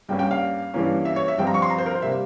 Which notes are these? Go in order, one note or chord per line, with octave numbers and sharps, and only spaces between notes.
G2 G3 A#3 C#4 G5
G5
F5
G2 E3 A#3 C#4
E5
C#5
E5
G2 F3 C4 G5
A#5
C#6
C6
A#5
C5
A#4
C5
C3 G3 A#3 E5